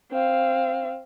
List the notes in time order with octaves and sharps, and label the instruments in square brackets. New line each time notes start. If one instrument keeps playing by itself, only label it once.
[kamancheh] C4 F5